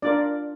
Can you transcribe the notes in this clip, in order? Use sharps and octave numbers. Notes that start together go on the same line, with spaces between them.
D4 F4 A#4 D5